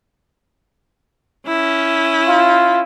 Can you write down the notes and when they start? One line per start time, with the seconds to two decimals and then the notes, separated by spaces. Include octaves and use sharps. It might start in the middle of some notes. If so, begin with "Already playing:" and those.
1.47 C#4 E4
2.28 F4